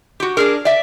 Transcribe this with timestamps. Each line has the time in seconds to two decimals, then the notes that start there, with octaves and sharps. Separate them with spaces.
0.20 F#4 G4
0.37 D4 G#4 A#4
0.65 D5 E5